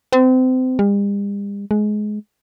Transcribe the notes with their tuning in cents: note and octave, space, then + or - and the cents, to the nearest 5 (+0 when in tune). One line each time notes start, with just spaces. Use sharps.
C4 -30
G3 +45
G#3 +20